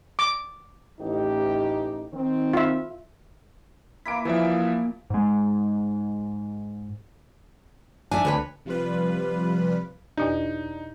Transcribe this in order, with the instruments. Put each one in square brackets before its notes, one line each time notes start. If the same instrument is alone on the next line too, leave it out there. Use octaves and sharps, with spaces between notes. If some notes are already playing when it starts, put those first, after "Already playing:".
[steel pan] D6
[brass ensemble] A1 D#4 G4
D#3 C4
[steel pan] F4 E5
[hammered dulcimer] E3 A#3 E4 [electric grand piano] B6 D7
[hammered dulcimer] A#2 [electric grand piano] E3 F3 E5
[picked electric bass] G#2 G#3
[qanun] D4 [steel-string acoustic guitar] E5 G#5
[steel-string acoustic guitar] D2 [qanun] B4 C#5 B5
[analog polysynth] C3 F3 G3 F4 B4
[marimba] E2 B2 G4 [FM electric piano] D4 [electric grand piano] D#4